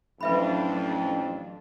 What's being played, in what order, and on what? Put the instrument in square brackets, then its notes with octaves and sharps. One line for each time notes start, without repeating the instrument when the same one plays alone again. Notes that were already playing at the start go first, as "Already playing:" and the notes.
[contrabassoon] A1 [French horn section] F2 [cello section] F#3 D4 [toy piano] B4 E5 B5